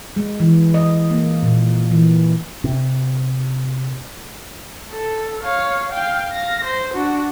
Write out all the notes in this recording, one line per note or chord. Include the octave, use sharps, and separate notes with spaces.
G#3
E3
D#5
A#3
A#2
E3
C3
A4
C#5 F5
F5 G5
F5 A#6
C5
D4 F#4